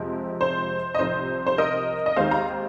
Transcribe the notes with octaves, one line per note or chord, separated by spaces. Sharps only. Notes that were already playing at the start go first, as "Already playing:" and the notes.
Already playing: F2 C3 F3 G#3 C4
C5
D#5
C2 C3 F3 C4 C5
C5
A#4 D#5
D#5
D#2 D#3 G#3 C4 C5 F5
F5 A#5